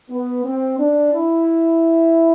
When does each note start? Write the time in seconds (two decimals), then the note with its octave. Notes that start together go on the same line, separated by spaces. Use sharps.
0.11 B3
0.45 C4
0.79 D4
1.13 E4